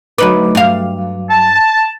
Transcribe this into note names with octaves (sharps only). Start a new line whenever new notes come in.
D2 F#3 D#4 B4 D6
G2 F5
A5